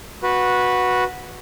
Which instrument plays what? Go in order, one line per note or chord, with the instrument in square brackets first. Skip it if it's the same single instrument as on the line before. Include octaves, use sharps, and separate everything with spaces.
[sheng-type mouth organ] F#4 B4